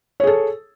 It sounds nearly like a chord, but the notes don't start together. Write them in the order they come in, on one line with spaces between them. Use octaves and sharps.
C#5 G#4 A4